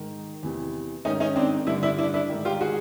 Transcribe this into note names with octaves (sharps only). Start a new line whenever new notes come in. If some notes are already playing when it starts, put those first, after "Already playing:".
Already playing: G#2 D#3
E2 C3 E3
G#2 D#3 C#4 D#4
C#4 D#4
C4 D4
G2 D3 D4 E4
D4 E4
D4 E4
D4 E4
G#2 D#3
F4 G4
F#4 G#4